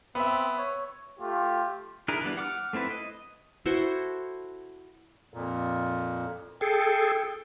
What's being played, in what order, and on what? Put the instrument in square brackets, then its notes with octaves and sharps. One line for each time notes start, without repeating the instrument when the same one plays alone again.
[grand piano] B3 E5 [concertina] C4 B5
[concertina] C#5
[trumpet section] A3 F4 G4
[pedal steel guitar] D4 E4 G#4 A#4
E3 G3 B3 D4
F#5 D6 F6
A3 C4 E4 B4
D#5
[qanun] E4 F#4 A4 C5
[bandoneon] F2 A#2
[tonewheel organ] G#4 A4 [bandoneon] G5